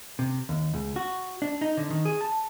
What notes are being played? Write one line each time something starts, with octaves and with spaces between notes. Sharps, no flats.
C3
D#2
C#2
F#4
D4
D#4
D3
D#3
G#4
A5